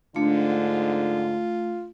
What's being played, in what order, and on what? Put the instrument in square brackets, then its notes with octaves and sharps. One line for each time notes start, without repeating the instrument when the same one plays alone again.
[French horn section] G#2 D3 [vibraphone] A3 [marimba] D4 [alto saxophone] F4